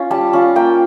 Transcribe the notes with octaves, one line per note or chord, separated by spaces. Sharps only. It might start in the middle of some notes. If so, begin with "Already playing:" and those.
Already playing: C#4 F4
G3 A5
C#4 F4
A#3 G5